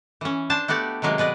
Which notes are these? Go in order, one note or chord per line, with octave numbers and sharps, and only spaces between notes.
E3 C#4
D4 C5 A5
A3 B3 F#4 G4 D5
C3 D#3 F#3 G#3 A#3
B2 B4 D5 D#5